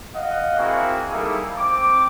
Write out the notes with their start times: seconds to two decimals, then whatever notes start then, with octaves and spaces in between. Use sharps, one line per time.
0.14 D#5 F5 F#5
0.57 A#3 C4 E4 F#4 G#4 A#4
1.10 G3 A#3 D#4 E4 G#4 A4
1.57 C4 D6